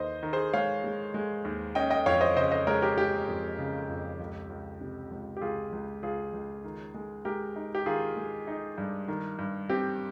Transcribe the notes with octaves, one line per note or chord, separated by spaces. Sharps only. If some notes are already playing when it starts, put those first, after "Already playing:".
Already playing: D#2 D#3 C5 D#5
D#3
G#4 C5
G#3 C#5 F5
G#3
G#3
D#2
C#4 D#5 G5
D#5 G5
F2 C#5 F5
C5 D#5
C#3 C5 D#5
C5 D#5
G#3 A#4 C#5
G4 A#4
G#3 G4
F2
C#3
F2
C#2
C#2
C3
C#2
G4
C#2 F4 G#4
C#2
C#2 F4 G#4
C#2
D#3
G#3
G#3 G4 A#4
D#4
G4
D#3 F4 G#4
G#3
D#4
G2
D#3
G2
C4 G4